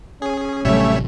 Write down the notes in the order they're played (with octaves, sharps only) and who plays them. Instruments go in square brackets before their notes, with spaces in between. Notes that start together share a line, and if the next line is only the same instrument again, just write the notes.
[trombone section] C#4 [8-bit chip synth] G#4
[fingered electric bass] A1 C3 F#3 [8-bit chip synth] G3 C#5 E5 [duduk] A3